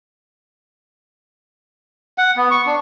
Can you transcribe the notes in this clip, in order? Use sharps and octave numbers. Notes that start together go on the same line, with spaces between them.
F#5
B3
C#6
D4